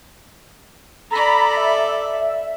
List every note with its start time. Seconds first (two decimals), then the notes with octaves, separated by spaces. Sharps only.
1.11 A4 D5 A#5 B5
1.57 E5